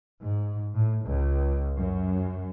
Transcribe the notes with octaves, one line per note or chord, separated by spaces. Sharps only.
G#2
A2
C#2
F#2